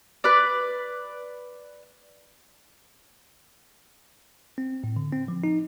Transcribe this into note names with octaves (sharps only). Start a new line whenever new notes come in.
B4 D5
C4
A2
D3
C4
F3
D#4